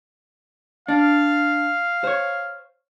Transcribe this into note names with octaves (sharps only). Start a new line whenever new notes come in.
D4 F5
C5 C#5